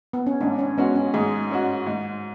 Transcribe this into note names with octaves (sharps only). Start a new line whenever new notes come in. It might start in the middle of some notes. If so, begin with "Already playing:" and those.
B3
C#4
G#2 D4
C#4
G#3 B3 C#4 F#4
C#4
G#2 G#4
G#3 C#4 F#4
G#2